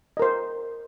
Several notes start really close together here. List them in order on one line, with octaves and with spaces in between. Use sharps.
D#5 A#4 C5